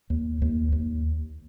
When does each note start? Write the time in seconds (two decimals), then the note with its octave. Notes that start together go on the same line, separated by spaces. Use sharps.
0.10 D#2
0.42 D#2
0.72 D#2